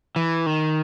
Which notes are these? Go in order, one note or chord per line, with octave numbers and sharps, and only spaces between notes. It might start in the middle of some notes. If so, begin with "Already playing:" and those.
E3
D#3